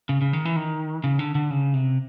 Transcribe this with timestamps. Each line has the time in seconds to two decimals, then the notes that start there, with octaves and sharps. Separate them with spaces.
0.09 C#3
0.21 C#3
0.33 D#3
0.45 E3
0.56 D#3
1.04 C#3
1.19 D3
1.35 D3
1.51 C#3
1.74 C3